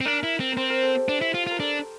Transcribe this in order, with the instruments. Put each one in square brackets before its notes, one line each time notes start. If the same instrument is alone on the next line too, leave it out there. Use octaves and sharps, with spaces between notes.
[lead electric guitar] C4
[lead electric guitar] D4 [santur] A#4
[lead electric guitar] E4
C4
[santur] A#4
[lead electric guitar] C4 [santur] C5
[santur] A#4
A4
G4
[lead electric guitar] D4 [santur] G4
[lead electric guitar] E4
F4
F4
[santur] A#4
[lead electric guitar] D4 [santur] A4